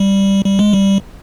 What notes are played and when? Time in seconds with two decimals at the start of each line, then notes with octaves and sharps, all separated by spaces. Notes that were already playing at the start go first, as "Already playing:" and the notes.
Already playing: G3
0.45 G3
0.59 G#3
0.73 G3